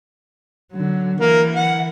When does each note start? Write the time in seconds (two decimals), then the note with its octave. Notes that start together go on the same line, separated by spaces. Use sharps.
0.73 D3 F#3
1.20 E3 A#3
1.56 F#5